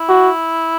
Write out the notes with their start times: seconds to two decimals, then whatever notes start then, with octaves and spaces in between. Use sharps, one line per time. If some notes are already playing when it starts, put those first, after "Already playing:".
Already playing: E4
0.09 F#4